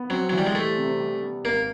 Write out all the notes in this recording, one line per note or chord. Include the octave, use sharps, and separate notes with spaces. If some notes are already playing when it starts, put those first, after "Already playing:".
Already playing: B3
F#3 C4
E3 F#3
G3
G#3
G3 A3
C3
G3
B3
G#1 A#3